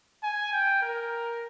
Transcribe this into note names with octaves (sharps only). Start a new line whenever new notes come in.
G#5
G5
A#4